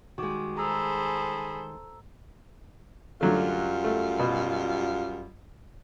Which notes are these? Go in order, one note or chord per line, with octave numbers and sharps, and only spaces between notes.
D#3 G3 G#3 F#4 D6
G#4 A4 C5 A#5 B5 E6
F#2 D3 F#3 G3 A3 F4
A3
B2